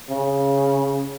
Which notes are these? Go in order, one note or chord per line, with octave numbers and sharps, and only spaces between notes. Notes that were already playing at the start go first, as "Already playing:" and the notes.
C#3